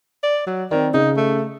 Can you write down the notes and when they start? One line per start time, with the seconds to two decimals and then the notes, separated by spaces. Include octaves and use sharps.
0.23 D5
0.47 F#3
0.71 D#3 C4 D5
0.94 C#3 D#4
1.17 A3